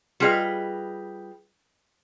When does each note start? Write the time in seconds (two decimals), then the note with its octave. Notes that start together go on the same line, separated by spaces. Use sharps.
0.20 G3 F4 G#4 B4 D#5